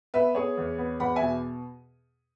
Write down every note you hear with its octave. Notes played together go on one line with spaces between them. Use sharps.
B3 B4 E5
B3 G#4 C#5
E2
B3
E2 F#5 B5
E5 G#5
B2